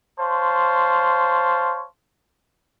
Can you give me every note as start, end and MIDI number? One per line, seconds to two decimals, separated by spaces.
0.18 1.85 72
0.18 1.85 73
0.18 1.85 77
0.18 1.85 81
0.18 1.85 84